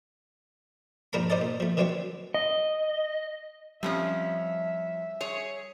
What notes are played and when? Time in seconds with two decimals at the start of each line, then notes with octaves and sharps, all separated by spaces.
1.13 G#2 F3 D4 A#4 A#5 B5
1.30 D#4 C5 D5 D#5 A5
1.41 A#2
1.60 F3 A3
1.77 D#3 E3 F#3 C4 D4 C#5
2.34 D#5
3.83 F2 F3 G3 C#4 E5
5.21 G#4 C#5